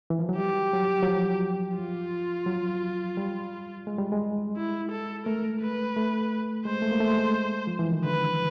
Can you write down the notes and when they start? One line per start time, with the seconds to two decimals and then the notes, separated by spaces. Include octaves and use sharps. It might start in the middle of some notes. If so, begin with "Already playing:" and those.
0.10 E3
0.19 F3
0.29 F#3
0.37 G3 G4
0.73 F#3
1.03 F#3
1.07 F3
1.77 F4
2.46 F#3
3.17 G3
3.87 G#3
3.98 G3
4.12 G#3
4.56 E4
4.91 A4
5.26 A3 A#4
5.61 B4
5.96 A3
6.65 G#3 C5
6.82 A3
6.91 A#3
7.00 A3
7.18 G#3
7.67 F3
7.79 E3
7.92 D#3
8.05 D3 B4